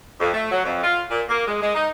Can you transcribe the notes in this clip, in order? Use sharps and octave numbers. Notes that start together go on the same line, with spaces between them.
F2
A3
F#3
F2
F4
A#2
A#3
G#3
G#3
D#4